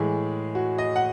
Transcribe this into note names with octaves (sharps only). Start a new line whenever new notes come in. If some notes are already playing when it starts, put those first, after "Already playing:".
Already playing: A2 E3 G#3 G#4
F#4
D#5
F#5